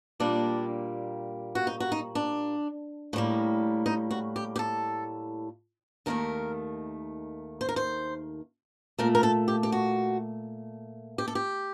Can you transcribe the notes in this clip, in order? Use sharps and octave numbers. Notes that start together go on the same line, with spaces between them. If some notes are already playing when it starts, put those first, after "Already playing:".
A#2 G3 A#3 D4
F#4
D#4
F#4
D#4
D4
A2 G3 A#3
D#4
F#4
G4
G4
A4
D#2 D#3 A3 A#4
C5
A#4
C5
A#2 A3 A#4
A#4
A4
G4
G4
F#4
G4
A4
G4